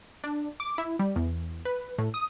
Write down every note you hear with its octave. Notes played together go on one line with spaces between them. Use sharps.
D4
D6
E4
G3
E2
B4
A2
D#6